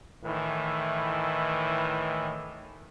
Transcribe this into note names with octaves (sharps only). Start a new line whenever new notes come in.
A2 D#3 E3 E4